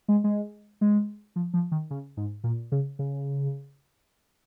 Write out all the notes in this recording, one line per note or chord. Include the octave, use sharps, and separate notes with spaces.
G#3
G#3
G#3
F3
F3
D#3
C#3
G#2
A#2
C#3
C#3